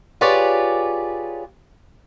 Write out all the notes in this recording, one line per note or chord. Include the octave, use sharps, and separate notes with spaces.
F4 G4 G#4 B4 C#5 D5